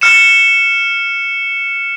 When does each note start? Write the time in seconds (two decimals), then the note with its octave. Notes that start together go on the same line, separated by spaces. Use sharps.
0.01 F6 C#7 E7